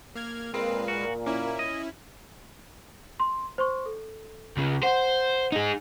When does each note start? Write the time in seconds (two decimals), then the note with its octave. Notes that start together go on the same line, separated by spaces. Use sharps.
0.15 A#3 F6 G#6
0.54 A#2 G#3 C4 A#4 B4 F5
0.88 F#4
1.26 A#3 C#4 E4
1.59 D#5
3.20 C6
3.58 C5 C6 C#6
3.86 A4
4.57 C#2 C#3
4.83 C5 F#5
5.52 D#4 G#4